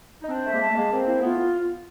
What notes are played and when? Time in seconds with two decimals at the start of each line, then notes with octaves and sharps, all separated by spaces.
0.22 D#4
0.29 C4 D4 C5
0.44 A3 E5
0.52 G#3 A#3
0.61 A5
0.68 A3
0.76 G#3 A#3 G#4
0.90 A#3 C4 C5
1.07 A#3 C4 E4
1.21 A3 B3 F4